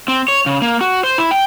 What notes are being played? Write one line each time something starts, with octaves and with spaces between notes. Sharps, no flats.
C4
C#5
C#3
A#3
F#4
C5
E4
G5